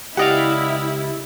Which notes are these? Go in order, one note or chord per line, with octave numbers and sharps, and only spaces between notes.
C#2 E4 G4 D5 D#5 F5 F#5